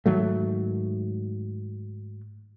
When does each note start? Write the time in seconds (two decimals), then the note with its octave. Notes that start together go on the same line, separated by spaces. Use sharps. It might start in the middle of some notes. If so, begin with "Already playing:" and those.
0.06 G#2 D#3 F#3 A3